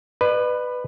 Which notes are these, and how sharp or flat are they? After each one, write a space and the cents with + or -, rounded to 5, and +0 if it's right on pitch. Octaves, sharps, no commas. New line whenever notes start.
B4 +5 D5 +45